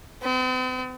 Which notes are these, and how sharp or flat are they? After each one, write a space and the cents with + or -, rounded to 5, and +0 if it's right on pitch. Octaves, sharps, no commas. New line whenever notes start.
C4 -45